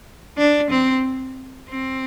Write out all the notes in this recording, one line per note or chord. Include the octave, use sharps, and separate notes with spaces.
D4
C4
C4